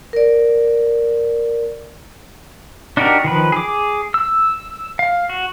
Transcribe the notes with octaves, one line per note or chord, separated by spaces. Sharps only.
A#4 D5
D4 D#4 F#4 G4 A#4
D#3 F3 B4
G#4 D6
E6
F5
F#4